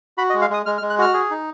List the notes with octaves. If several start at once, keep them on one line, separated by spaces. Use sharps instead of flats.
F#4 B5
D#5
G#3
F5
G#3 D#6
G#3 F6
F6
G#3
F#6
F#4 F6
G#4
D#4